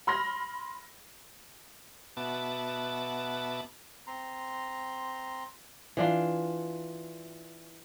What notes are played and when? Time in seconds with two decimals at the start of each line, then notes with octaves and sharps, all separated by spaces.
0.07 B5 C6 F6 A#6
2.17 B2 B3 F#4 E5 A5 D6
4.07 C4 A#5 C6
5.97 E3 D4 F4